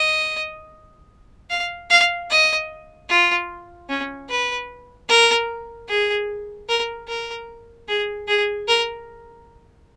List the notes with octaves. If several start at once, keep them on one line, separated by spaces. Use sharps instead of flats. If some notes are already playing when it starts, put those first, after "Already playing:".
Already playing: D#5
F5
F5
D#5
F4
C#4
B4
A#4
G#4
A#4
A#4
G#4
G#4
A#4